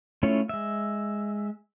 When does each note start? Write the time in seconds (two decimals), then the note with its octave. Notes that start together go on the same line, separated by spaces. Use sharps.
0.23 A3 C#4 E4 F4 C#5
0.49 G#3 E5